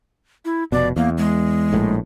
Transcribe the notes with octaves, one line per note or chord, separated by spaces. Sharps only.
E4
F1 B2 D5
E2 A#3
G#3
A#1 A2